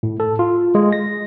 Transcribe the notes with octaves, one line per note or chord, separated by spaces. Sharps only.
A2
A4
F4
G#3
A#6